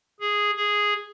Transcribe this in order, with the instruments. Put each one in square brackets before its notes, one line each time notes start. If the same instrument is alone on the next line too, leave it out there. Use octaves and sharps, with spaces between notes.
[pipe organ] G#4
G#4